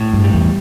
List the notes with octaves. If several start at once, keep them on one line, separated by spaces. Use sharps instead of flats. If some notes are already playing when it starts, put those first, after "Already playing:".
Already playing: A2
G2
G3
E2